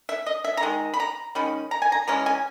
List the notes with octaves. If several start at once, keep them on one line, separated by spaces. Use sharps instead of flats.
E5
D#5
E5
A#5
D#3 G#3
B5
A#5
D#3 G#3 C#4 B5
A#5
G#5
A#5
E3 G#3 C#4 A#5
G#5